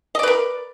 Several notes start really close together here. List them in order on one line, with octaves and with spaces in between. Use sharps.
D#5 D5 B4 A#4